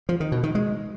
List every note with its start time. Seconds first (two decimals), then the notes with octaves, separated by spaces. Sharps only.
0.09 F3
0.20 D#3
0.32 B2
0.43 D#3
0.55 G#3